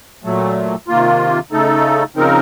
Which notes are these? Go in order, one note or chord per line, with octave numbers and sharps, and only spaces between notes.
A#2 F#3 A3
C3 D#3 A#3 F4
C#3 A3 D#4 A4
C#3 F3 C4 D#4 A#4